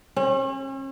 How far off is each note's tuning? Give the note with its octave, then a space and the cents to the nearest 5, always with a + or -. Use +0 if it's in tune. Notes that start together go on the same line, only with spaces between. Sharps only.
C#4 -40